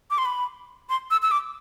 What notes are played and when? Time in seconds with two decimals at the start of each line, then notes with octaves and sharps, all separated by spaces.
0.10 D6
0.18 C6
0.25 B5
0.89 C6
1.11 E6
1.22 E6
1.31 D6